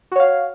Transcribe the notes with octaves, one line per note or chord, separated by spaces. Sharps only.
F#4 C#5 F5